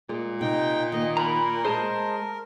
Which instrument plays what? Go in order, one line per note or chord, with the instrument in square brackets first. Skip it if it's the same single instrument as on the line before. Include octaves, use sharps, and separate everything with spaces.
[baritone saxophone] A#2 [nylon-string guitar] G#3
[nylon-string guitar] C3 [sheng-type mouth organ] D#4 G5
[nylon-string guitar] D#3 A#3 [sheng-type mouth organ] D#5
[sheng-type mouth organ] A#4 [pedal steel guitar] A#5 B5
[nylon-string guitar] G#3 G#4 [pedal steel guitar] C5 D#5 A5